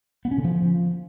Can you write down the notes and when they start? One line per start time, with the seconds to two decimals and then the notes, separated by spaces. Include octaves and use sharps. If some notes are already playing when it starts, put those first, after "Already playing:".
0.25 B3
0.31 C#4
0.38 D3
0.44 F3